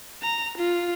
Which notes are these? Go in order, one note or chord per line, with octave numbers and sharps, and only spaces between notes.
A#5
F4